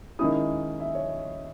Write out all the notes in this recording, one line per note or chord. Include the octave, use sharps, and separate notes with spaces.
D#3 G#3 C#4 E4 D#6
E5
C#5